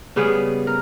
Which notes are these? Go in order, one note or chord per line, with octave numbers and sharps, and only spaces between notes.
C#3 G3 B3 G#4
A#4